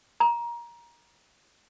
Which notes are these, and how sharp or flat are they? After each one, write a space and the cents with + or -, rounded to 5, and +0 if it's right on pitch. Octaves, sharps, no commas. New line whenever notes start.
A#5 +20